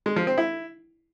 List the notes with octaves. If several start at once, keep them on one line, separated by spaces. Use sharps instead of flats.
G#3
F3
C4
E4